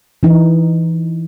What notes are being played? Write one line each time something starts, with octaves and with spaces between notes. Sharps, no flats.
E3 D#4